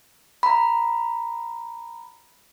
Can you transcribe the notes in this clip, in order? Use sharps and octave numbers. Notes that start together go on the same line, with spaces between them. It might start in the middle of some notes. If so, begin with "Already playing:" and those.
A#5 B5